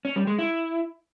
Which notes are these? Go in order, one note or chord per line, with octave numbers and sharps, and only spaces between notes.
C#4
G3
G#3
E4